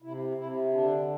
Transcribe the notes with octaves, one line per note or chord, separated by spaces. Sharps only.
C3 E4
C3 E4
D3 D4